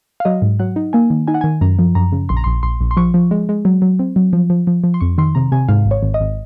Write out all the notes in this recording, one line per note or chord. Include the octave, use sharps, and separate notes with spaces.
F5
F#3 D#5
G#2
F#3 F#5
D#4
A#3 G#5
D#3
D#4 G#5
F#5
D#3 G#5
F#2 A#5
F3
F#2 A#5
C#3
A#1 C6
A#5
A#1 C6
A#1 C6
A#1
C6
F3 C#6
F3
G#3
G#3
F#3
F#3
C4
F#3
F3
F3
F3
F3
C6
F2 C#6
D#3 C6
C3 A#5
C3 G#5
G#2 F5
G#1
C#5
G#1
D#5
G#1